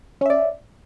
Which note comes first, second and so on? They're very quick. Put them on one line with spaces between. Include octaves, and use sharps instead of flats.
C#4 E5 D5